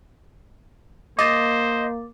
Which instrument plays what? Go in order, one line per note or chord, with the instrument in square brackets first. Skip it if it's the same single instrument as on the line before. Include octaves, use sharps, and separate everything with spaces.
[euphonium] A#3 [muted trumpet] C5 [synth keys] D#5 [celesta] D6 A6